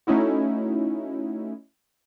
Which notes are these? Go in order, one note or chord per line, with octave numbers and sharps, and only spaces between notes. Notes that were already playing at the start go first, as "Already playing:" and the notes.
A3 C#4 D#4 E4 F#4